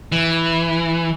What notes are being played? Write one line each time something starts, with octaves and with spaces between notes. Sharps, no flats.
E3